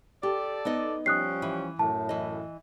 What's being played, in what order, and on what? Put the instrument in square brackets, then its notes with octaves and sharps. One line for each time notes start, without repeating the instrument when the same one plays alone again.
[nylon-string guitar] G4 [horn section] A4 D5
[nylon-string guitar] B3 D#4 D#5
[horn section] F3 G3 C#4 [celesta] D#6 F#6 C7
[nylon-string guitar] E3
[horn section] F#2 A2 [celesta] A5
[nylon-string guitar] E3 D#5